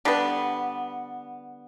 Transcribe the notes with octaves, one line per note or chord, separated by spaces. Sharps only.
D3 G3 B3